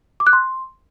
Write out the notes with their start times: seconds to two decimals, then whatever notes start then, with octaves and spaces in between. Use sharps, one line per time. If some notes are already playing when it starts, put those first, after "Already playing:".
0.20 D6
0.27 F#6
0.33 C6